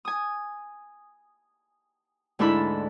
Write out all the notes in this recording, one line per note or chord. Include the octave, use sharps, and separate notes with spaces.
G#5 D#6
D2 G#2 D4 E4 A4 B5